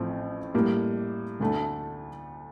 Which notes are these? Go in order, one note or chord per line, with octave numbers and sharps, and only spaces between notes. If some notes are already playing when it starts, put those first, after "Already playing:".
Already playing: A1 A2 F3 C4
A2 G3 A#3
D2 D3 A3